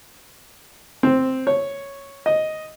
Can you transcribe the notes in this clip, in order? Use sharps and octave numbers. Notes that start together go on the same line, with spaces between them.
C4
C#5
D#5